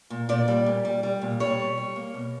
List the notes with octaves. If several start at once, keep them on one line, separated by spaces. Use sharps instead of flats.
A#2
A#2 D5
G3
A#2
G3
G3
A#2
G3 C#5
B2
G3
A#3
B2